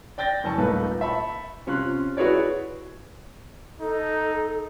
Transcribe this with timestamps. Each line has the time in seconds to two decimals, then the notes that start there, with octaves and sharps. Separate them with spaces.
0.18 D5 G5 G6 A6 A#6
0.44 F#1 G#5 A5 C#6
0.58 D#1 A3 A#3 D#4 B4
1.01 E5 A5 B5 C#6
1.67 C3 C#4 F4 C6 F#6
2.17 E4 F#4 G#4 B4 C#5 D5
3.80 D#4 A4